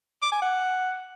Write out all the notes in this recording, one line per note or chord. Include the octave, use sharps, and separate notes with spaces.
D6
G#5
F#5